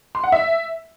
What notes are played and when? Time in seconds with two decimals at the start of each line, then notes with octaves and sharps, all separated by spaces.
0.15 C6
0.24 F#5
0.32 E5